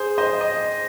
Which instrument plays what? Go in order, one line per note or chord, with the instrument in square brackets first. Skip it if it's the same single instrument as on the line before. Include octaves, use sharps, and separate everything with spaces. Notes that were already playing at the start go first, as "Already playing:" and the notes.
Already playing: [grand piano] G#4 C5
C5 D#5
D#5